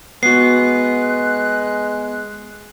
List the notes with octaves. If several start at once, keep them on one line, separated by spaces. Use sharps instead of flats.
G#3 B3 F#4 F#6 C7